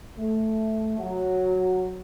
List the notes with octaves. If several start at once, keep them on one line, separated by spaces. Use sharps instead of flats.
A3
F#3